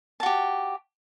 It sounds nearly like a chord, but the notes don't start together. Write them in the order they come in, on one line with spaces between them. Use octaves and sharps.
A5 F#4 G4